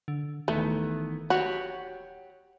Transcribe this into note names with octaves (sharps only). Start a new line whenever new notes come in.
D3
D#1 D#3 E3 A3 B3
F#4 G4 C#5 F#5